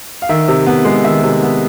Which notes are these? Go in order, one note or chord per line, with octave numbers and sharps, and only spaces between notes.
F5
D#3 E5
C3
B3
G#3
D#3 E5
C3
B3